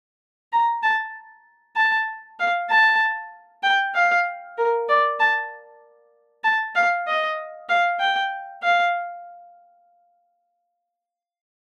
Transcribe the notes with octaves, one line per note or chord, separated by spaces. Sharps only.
A#5
A5
A5
F5
A5
G5
F5
A#4
D5
A5
A5
F5
D#5
F5
G5
F5